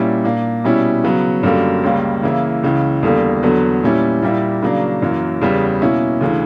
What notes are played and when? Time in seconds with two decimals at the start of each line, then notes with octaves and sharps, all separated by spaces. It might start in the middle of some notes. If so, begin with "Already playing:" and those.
Already playing: A#2 G3 C#4 E4
0.24 A#2 A#3 D4
0.64 B2 G3 C#4 E4
1.04 C#3 F#3 B3
1.43 F#2 D3 G3 A#3
1.83 C#2 C#3 G3 A#3
2.23 C#3 E3 A#3 E4
2.63 C#2 C#3 E3
3.03 E2 D3 G3 A#3
3.43 E2 D3 F#3 B3
3.83 A#2 G3 C#4 E4
4.22 A#2 G3 A#3 E4
4.62 C#3 F#3 A#3 D4
5.02 F#2 E3 A#3
5.41 E2 C#3 G3 B3
5.81 B2 A#3 C#4 E4
6.21 D2 C#3 E3